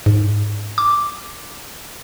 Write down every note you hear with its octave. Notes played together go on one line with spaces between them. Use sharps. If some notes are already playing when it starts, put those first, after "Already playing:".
G#2
D6